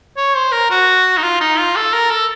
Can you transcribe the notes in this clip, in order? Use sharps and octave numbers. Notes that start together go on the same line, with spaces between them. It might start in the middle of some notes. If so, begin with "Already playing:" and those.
C#5
C5
A#4
F#4
D#4
F4
D#4
F4
A4
A#4
A4